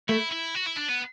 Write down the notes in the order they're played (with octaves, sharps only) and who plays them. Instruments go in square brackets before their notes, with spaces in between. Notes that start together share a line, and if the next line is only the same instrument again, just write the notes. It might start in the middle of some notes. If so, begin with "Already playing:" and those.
[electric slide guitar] A3 [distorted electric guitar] E4
[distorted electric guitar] E4
F#4
E4
D4
B3